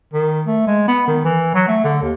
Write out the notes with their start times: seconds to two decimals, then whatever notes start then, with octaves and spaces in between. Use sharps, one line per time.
0.14 D#3
0.47 A3
0.67 G#3
0.88 B3
1.08 D#3
1.25 E3
1.55 F#3
1.68 A3
1.84 D3
2.02 D#2